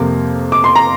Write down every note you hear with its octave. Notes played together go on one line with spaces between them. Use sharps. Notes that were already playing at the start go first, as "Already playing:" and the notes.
Already playing: F2 C3 A#3
D6
C6
A#5